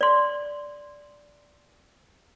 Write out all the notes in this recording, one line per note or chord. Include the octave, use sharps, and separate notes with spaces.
D5 C6